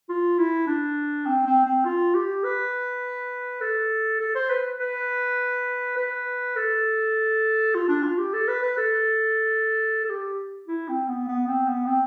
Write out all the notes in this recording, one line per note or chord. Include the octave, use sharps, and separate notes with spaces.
F4
E4
D4
C4
C4
C4
F4
G4
B4
A4
A4
C5
B4
B4
B4
A4
F4
D4
F4
G4
A4
B4
B4
A4
A4
G4
E4
C4
B3
B3
C4
B3
C4